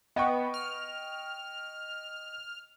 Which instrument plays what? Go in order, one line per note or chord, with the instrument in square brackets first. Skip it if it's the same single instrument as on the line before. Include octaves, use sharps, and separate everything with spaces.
[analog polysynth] B3 [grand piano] D#5 G5 C#6
[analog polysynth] F6